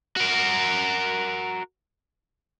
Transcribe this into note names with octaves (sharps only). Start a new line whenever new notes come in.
F#4 A#4